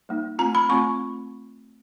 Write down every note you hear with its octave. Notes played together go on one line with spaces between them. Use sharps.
G3 A#3 D#4
A3 C4 F4 A#5
B5
A3 C4 F4 C#6